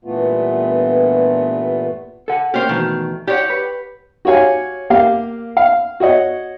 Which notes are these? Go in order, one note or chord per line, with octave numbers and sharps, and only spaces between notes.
G2 A#2 E3 A3 B3 F4
A4 F#5
A#3 C#4 G4 C5 F5
B2 D#3 E3 A3
E4 G4 C#5 D5 F#5
B4
F#4 G4 C#5 F5 G#5
A#3 G4 F5
F5
F#4 C#5 D#5 F#5